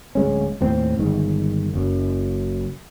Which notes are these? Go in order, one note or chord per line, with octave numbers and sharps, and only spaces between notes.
D1 G#3 C#4
D#2 A2 C4
G1 D#3 G#3
F#1 F#2